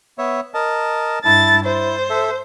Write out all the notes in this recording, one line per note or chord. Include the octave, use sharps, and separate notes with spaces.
B3 C#5 E5
A#4 D#5 A5
G2 E4 A5 A6
E4 C5
A4 E5